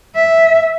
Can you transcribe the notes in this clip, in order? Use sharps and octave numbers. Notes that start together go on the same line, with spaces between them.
E5